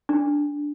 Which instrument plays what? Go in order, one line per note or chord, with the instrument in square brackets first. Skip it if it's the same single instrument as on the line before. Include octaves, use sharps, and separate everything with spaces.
[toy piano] D4